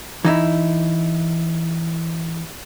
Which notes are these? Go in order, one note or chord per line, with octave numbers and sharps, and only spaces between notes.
E3 D#4 E4